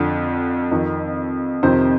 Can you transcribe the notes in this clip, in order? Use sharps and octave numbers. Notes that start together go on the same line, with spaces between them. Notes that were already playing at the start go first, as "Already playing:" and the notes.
Already playing: F2 D3
F2 D#3
F2 C3 D#3 C5